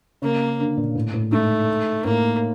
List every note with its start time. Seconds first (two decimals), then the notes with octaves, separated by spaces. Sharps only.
0.22 C#3 A#3
0.59 D3
0.77 A#2
0.95 A2
1.14 A2
1.32 G#2 A3
2.05 A2 A#3